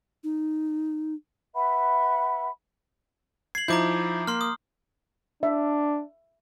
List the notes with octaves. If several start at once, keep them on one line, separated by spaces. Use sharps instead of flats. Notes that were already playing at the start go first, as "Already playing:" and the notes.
D#4
B4 E5 F#5 B5
G#6 C7 F#7
F3 D#4 E4 A#5 D6 G6
A#3 C6 F6
D#6
D4 E5